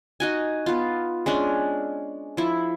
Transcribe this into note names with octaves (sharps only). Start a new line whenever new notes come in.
D#4 F#4 G#5
B3 F4
G#3 C#4 D4
F3 E4